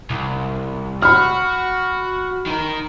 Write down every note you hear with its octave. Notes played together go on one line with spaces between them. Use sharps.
C2
F#4 B5 F6
D#3 A#4